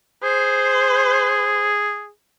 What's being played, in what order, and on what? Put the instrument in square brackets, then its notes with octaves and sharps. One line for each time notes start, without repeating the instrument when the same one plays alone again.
[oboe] G#4 [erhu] C5